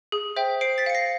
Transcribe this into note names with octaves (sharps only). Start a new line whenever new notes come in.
G#4
C5 E5 G5
C5 C7 D7
A6 B6
F5 C#7
A#6 C7